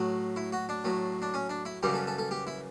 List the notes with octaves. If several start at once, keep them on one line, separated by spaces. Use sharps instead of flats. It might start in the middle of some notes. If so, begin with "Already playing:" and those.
Already playing: A2 F#3
E4
F#4
D4
A2 F#3
D4
C#4
D4
E4
F#2 C#3 E3 G3 G4
A4
A4
A4
G4
E4